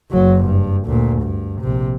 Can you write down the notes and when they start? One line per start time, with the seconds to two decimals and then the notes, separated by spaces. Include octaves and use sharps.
0.11 F#1 F#3
0.45 G2
0.86 D2 A#2
1.21 G2
1.61 A#1 C3